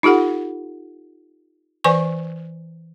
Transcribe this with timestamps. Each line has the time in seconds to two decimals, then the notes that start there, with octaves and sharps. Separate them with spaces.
0.03 D#4 F4 G4 A4 F#5
1.84 E3 B4 D5 G#5 C#6